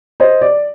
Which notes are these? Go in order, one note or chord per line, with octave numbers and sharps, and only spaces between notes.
C5 D#5
D5